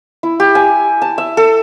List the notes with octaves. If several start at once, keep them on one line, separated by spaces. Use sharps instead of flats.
E4
G4
G#5
A5
E5
A4